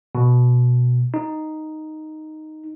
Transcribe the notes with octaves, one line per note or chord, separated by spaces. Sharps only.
B2
D#4